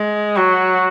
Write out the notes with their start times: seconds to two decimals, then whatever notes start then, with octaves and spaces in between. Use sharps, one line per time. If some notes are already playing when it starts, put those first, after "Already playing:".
Already playing: G#3
0.36 F#3 F#4